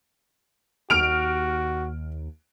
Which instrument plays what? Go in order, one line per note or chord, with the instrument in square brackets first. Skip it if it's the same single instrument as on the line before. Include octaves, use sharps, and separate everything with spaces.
[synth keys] D#2 [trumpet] F#4 [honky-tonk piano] F6 D7 F7